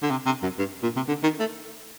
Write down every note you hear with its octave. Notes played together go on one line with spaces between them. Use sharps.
D3
C3
C3
F#2
G2
A#2
C3
D3
D#3
A3